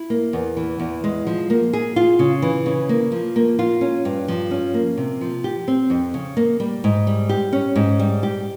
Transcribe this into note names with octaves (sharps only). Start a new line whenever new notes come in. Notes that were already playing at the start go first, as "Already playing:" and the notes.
Already playing: E4
A#3
E2
E3
E2
G#3
F3
A#3
G#4
F4
C#3
E3
C#3
A#3
F3
A#3
F4
C#4
G2
F3
C#4
A#3
C3
F3
G4
C4
F2
C#3
A#3
G3
G#2
G3
G4
C#4
G#2
G3
G4